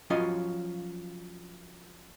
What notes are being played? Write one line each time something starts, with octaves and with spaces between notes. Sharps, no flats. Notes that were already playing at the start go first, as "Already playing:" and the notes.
F3 F#3 C#4 F4 D#5